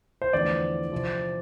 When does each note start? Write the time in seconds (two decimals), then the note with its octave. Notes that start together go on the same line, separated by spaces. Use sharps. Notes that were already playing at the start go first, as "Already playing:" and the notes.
0.22 C5
0.33 E2 D3 F3 A3 C4 D5
0.92 C3 F3 C4